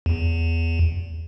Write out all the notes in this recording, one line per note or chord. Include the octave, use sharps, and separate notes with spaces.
E2